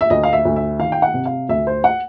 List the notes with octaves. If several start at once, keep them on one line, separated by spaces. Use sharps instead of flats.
E5
D2 D#5
F5
E5
D2
E5
D#3 F5
G5
F#5
C3
F5
D2 E5
C5
F#5